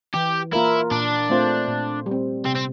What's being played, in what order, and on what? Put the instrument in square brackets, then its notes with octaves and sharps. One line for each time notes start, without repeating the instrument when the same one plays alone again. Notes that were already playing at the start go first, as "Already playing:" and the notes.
[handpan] E3 [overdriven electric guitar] G4
[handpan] A#3 F4 A#4 [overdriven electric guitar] E4
[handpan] A#2 [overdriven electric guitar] D4
[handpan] A3 C4 F4 C5
A#2
G3
C4
[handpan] C3 [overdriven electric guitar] C4
[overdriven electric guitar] C4